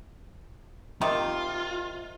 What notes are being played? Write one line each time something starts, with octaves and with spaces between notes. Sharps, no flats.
C3 D#3 F4